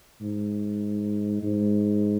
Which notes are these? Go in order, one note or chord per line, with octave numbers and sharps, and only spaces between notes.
G#2
G#2